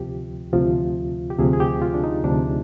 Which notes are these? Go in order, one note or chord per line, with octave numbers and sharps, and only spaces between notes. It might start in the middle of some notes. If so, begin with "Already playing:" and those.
Already playing: D2 C3 F3 G4
D2 C3 F3 F4
G4
D2 C3 F3 G#4
G#4
G4
F4
D4
D#4
D2 C3 F3 D4